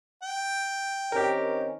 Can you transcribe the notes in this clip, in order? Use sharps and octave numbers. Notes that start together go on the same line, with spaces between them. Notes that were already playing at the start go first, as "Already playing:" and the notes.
G5
D#3 C4 C#4 G4 A#4